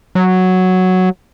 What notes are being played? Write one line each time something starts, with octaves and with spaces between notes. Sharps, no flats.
F#3